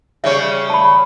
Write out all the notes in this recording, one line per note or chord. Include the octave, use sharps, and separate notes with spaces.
C#3 G3 C#5 E5
A5 B5